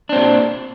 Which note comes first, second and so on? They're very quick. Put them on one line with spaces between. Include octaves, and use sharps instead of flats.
D4 C4 A#2